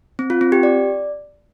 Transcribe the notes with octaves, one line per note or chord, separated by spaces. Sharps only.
C4
F4
C4
G4
D5